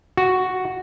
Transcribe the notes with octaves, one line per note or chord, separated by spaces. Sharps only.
F#4